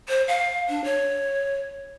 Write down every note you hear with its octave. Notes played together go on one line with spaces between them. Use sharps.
C5
F5
D4
C#5